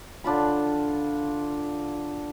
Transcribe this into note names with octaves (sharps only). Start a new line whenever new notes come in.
D3 D4 F4 B5